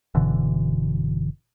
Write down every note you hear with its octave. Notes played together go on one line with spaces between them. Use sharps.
F#1 B2 D3 E3